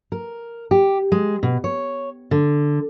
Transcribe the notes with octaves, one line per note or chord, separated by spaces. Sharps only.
A#4
G4
G#3
B2
C#5
D3